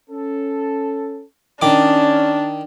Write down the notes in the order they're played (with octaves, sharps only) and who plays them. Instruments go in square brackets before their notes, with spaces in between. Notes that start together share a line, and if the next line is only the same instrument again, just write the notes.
[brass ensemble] C#4 A4
[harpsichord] D#3 D6 [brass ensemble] C#4 [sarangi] D4